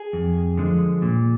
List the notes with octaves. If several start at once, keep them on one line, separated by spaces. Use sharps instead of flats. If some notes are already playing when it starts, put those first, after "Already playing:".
Already playing: G#4
F2
D3 F3 G#3
A#2